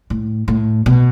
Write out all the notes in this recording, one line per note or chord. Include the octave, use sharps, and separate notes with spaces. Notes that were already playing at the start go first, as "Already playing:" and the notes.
A2
A2
B2